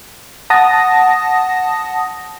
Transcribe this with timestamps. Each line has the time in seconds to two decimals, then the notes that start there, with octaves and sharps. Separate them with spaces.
0.50 F#5 A5 D#6 A#6